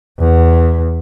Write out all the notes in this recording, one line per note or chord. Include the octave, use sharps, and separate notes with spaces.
E2